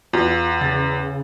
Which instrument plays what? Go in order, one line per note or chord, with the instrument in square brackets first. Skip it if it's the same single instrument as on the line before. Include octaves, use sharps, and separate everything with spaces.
[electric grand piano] E2 [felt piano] F4
[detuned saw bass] C#3 [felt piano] A6